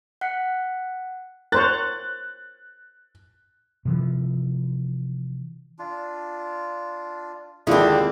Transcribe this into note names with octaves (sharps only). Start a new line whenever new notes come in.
F#5 F#6 B6 C#7
A#4 C5 C#5 F#6 A6
C3 E3 F3
D4 F4
D#2 D3 G#3 C4 D4 E4 F4